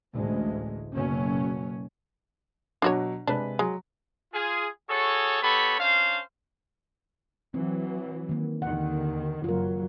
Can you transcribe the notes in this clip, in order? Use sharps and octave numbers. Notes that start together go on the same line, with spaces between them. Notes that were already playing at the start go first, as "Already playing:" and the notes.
A1 D2 G#3
F#1 B2 F#3 C#4
B2 F#3 D4 F#4 C#5
C3 G#3 D4 B4
F#3 G#3
F4 G#4
F#4 G#4 A4 C#5
B3 G4 A4 C#5 B5
C#4 D4 C5 F5
E3 F#3 C4
D#3 A#3
D#2 D3 D#3 F#5
F#1 F#3 F4 A#4